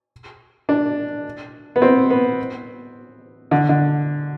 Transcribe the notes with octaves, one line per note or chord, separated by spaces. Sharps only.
D4
B3
C4
B3
D3
D3